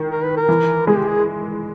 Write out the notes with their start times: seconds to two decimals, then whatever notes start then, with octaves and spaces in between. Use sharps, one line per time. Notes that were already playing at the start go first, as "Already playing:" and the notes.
Already playing: D#3
0.11 A#4
0.23 B4
0.37 A#4
0.49 E3
0.87 G#3 G#4
0.97 G4
1.08 G#4